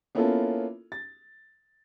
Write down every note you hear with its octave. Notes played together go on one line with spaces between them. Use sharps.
A#3 B3 C#4 E4 F4 A4
A6